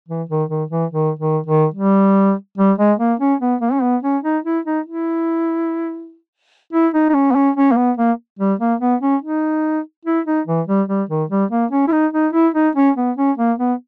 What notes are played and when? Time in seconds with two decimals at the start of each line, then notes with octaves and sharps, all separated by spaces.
0.08 E3
0.29 D#3
0.49 D#3
0.71 E3
0.91 D#3
1.19 D#3
1.46 D#3
1.74 G3
2.58 G3
2.78 G#3
2.99 A#3
3.20 C#4
3.41 B3
3.61 A#3
3.72 C#4
3.82 B3
4.03 C#4
4.24 D#4
4.45 E4
4.65 D#4
4.86 E4
6.73 E4
6.94 D#4
7.10 D#4
7.14 C#4
7.31 B3
7.35 C#4
7.56 C#4
7.72 A#3
7.77 B3
7.97 A#3
8.39 G3
8.60 A#3
8.80 B3
9.01 C#4
9.22 D#4
10.05 E4
10.26 D#4
10.47 E3
10.67 G3
10.88 G3
11.09 D#3
11.30 G3
11.51 A#3
11.71 C#4
11.88 E4
11.92 D#4
12.13 D#4
12.33 E4
12.54 D#4
12.75 C#4
12.96 B3
13.17 C#4
13.38 A#3
13.59 B3